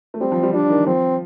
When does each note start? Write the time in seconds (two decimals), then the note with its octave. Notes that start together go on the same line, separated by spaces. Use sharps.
0.14 A3
0.21 G3 C4
0.32 F3
0.43 G3
0.54 G3 D4
0.70 D#3
0.87 F3 C4